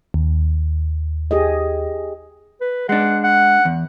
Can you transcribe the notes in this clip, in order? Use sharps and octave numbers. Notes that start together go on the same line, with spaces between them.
D#2
G4 G#4 D#5
B4
G#3 D4 F#5
F#5
E2